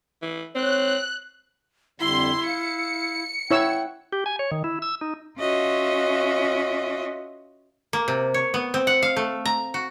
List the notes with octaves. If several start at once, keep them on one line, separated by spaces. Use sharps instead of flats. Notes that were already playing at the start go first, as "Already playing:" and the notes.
E3
C4 C#5 F#6
F2 D3 G3 E4 C6
F5 C#7
E4 C#5 F#5 G5 E6
G4
G#5
C#5
D#3
E4
E6
D#4
C#4 F4 F#4 D#5 E5
A#3
C3
C#5
B3
C4
F#5
F5
A3
A#5
F#4